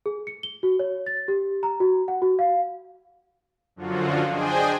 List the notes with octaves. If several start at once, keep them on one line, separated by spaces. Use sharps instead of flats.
G#4
C#7
G7
F#4
C#5
A6
G4
A#5
F#4
F#5
F#4
F5
F#2 D3 F3 F#3 F4 F#4
D4 G#4 C5 D#5 G5 G#5